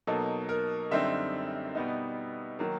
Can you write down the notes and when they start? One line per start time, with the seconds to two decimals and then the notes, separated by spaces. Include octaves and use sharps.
0.07 B2 F#3 A#3 D#4 A4
0.49 A#4
0.91 F#2 D3 G3 C4 D#4 E5
1.75 B2 G3 B3 D#4
2.59 D#3 F#3 A#3